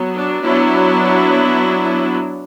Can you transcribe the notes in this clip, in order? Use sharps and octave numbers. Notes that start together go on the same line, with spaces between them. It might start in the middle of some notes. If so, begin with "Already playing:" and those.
Already playing: F#3 B3
D4
F#3 B3 D4 E4